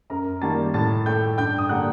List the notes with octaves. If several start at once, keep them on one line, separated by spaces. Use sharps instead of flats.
F#2 A#4 A#5
D#3 G3 A#3 A5 A6
A2 A5 A6
A3 G5 G6
G2 G5 G6
D#6
D3 G3 A#3 F#5 F#6